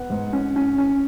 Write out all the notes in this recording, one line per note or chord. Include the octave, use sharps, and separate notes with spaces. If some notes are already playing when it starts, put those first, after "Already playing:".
Already playing: B3 F#5
G#2
C#4
C#4
C#4